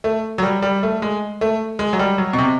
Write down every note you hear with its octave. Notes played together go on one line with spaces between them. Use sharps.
A3
F#3
G3
G3
A3
G#3
A3
G#3
F#3
G3
F#3
B2
C3